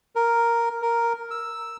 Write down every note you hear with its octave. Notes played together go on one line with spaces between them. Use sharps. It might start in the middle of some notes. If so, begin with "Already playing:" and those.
A#4
A#4
E6